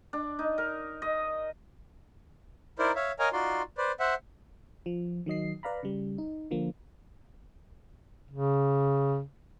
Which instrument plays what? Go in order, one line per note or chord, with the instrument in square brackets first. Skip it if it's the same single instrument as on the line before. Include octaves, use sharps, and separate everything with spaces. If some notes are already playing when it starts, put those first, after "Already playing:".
[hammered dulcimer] D4
D#4
A#4
D#5
[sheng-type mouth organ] D#4 E4 A#4 C5 D5
C#5 E5 F5
A#4 C#5 D#5 F5 G#5 A#5
D#4 F4 F#4 D5 C6
B4 C5 D5
C5 E5 F#5
[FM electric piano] F3
D#3 F#3 D#5 C7
B4 D5 F5 A#5 B5
C#3 G3
D#4
D3 F3 A#3
[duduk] C#3